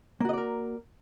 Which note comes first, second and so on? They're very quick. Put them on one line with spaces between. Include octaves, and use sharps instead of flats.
A#3 F#4 D#5 D5 A#4